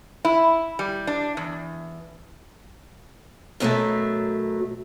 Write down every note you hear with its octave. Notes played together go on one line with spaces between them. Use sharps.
E4
G3
D4
E2
F#2 B2 F#3 G3 A3